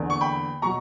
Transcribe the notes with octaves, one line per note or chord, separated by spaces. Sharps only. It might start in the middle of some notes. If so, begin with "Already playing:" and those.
Already playing: E2 D3 A#3
C#6
G5 B5
B2 F#3 A#5 C#6